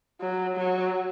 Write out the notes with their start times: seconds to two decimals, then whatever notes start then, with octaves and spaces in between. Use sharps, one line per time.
0.21 F#3
0.57 F#3